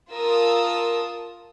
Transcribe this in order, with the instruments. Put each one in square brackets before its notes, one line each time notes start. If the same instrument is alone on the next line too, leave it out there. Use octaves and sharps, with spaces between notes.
[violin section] F4 A#4 A5 D#6 E6